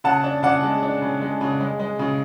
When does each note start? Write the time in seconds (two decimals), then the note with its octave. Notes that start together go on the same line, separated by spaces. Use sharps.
0.04 C#3 F#5 A5
0.24 D4
0.43 C#3 D5 F#5
0.63 G#3
0.82 D4
1.02 C#3
1.22 G#3
1.41 C#3
1.60 G#3
1.79 G#3
1.99 C#3